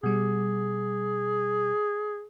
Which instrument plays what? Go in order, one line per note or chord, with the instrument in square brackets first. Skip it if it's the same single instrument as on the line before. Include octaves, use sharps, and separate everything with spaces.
[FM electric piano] B2 G3 [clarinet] G#4